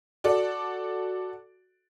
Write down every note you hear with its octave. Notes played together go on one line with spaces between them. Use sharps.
F#4 A4 D5